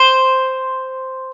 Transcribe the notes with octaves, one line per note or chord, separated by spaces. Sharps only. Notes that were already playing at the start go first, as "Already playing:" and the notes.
Already playing: C5